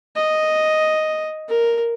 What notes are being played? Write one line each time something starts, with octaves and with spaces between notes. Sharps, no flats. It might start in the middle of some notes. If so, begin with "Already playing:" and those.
D#5
A#4